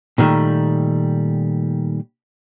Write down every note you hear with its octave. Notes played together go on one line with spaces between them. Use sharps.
A#2 D3 D#3 G3 A3